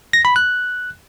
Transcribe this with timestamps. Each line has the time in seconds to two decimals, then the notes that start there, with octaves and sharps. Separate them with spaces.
0.13 A#6
0.25 B5
0.36 F#6